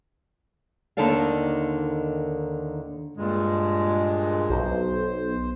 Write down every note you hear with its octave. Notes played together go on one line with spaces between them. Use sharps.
D#2 D3 D#3 A4 D5 F5
G2 A#2 G#3
B1 C5